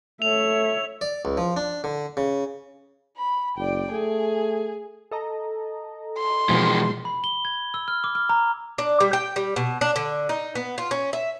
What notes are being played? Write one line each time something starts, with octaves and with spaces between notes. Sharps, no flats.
A3 C#5 E5 F7
D5
C#2
F3
D4
D3
C#3
B5
F#1 D5 G5
A3 G#4
A4 D#5 A#5
C6
B2 E3 F3 G#3 A#3
B5
G7
G#6
E6
F6
D6
F6
A#5
D4
G3
G5
G3
B2
D4
D3
D#4
B3
F4
C#4
E5